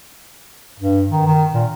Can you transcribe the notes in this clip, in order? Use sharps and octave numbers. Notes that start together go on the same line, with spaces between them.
G2
D#3
D#3
A#2